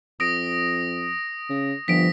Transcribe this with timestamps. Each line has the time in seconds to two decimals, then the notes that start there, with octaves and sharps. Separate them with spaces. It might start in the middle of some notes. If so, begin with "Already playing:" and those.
0.20 F2 D#6 A#6 D7
1.50 C#3
1.88 G1 F3 B6 D7